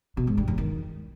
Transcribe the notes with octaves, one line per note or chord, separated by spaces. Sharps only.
B2
G#2
G2
E2
D#3